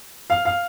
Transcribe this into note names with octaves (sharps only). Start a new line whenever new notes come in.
F5
F5